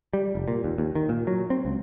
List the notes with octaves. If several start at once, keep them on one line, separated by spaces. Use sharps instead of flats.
G3
F1
A#2
D#2
D#2
D#3
A#2
F#3
C4
C#2